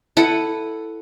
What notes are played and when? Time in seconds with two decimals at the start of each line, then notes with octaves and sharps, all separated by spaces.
0.17 E4 A4 B4 F#5